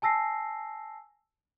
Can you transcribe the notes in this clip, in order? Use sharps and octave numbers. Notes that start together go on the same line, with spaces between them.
G#5 A5 E6 A#6 C7